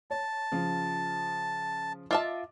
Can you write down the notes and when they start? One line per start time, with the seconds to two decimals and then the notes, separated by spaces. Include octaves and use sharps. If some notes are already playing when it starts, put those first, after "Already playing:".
0.11 C#5 A5
0.52 C#3 F3 F4
2.11 F4 D#5 E5 A5 D6